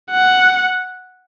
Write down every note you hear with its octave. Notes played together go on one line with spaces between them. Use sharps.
F#5